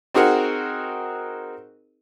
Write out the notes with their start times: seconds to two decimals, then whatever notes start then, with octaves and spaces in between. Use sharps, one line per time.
0.14 C4 D#4 F#4 G#4 A#4 F#5